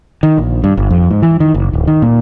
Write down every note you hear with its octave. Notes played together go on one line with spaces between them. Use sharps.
D#3
A#1
G2
G1
F2
G#2
E3
D#3
F#1
D1
D#3
A#2